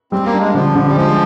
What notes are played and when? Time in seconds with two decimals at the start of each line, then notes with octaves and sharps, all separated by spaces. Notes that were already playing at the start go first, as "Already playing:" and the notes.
0.12 G3 C4
0.26 A#3
0.33 D4
0.40 G#3
0.54 D3 F3
0.75 D3
0.89 G3
0.96 F3 G#3